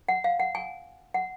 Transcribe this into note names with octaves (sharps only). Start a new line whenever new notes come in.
F#5
F5
F#5
G#5
F#5